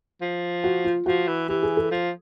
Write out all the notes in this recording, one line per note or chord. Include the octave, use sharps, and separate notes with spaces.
F3
F#4
F4
F3 F#4
E3
E3 G4
G#4
A4
F3